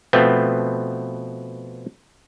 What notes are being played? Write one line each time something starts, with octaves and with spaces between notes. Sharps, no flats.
B2 F3 A3 B3 C4